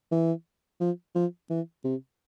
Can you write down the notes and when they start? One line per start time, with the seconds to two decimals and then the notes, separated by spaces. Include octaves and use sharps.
0.11 E3
0.80 F3
1.15 F3
1.50 E3
1.84 C3